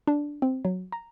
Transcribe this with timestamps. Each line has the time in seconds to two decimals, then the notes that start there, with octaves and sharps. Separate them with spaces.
0.07 D4
0.42 C4
0.65 F#3
0.92 A#5